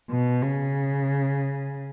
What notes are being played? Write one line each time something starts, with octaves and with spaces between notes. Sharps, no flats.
B2
C#3